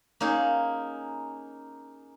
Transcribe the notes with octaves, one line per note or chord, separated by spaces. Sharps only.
A#3 C#4 D#4 G#4